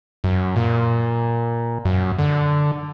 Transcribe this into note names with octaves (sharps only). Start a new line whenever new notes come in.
F#2
A#2
F#2
D3